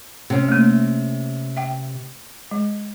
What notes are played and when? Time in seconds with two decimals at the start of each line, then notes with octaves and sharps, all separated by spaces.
0.30 C3 C#4
0.48 A3 A#3
1.57 E5 G5
2.51 G#3